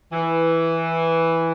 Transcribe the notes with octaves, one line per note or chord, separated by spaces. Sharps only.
E3